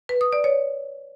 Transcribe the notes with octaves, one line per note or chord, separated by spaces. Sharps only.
B4
D#6
D5
C#5